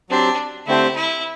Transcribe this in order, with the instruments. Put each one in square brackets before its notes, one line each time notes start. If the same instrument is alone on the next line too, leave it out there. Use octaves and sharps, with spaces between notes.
[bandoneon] F#3 C4 G4 C5 [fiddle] D4
[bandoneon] D3 A3 C4 G4 C5 [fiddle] E4
[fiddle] E4